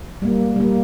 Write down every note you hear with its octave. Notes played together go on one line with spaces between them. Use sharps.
G3 A#3
G3 A#3